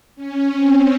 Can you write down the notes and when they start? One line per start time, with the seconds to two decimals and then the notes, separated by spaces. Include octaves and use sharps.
0.16 C#4
0.53 C4